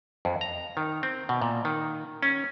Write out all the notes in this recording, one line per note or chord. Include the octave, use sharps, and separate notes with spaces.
F2
A#5
D#3
C4
B2
A#2
D#3
C#4